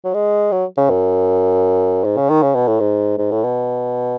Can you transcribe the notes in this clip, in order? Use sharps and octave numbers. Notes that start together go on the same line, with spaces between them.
F#3
G#3
F#3
C#3
F#2
G#2
C#3
D#3
C#3
B2
A2
G#2
G#2
A2
B2